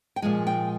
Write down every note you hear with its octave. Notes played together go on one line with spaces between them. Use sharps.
G5
A#2 F3 G#3 G#5
G5